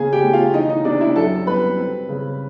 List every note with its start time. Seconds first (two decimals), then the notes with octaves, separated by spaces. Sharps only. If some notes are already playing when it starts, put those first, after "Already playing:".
Already playing: C#3 A#3 G#4 G#5
0.13 G4 G5
0.24 A3
0.33 F4 F5
0.54 E3 D#4 D#5
0.69 D#4 D#5
0.85 C3 D4 D5
1.00 E4 E5
1.16 F#2 A4 A5
1.47 G3 B4 B5
1.78 C4
2.09 C#3